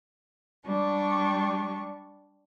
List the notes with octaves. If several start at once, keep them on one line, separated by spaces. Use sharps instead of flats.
G3 D4 C#6